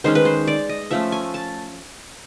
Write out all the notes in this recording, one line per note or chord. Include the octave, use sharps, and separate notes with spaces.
D#3 G#3 C#4 C5
B4
C5
D5
D#5
F3 A3 C#4 E5
G#5
A5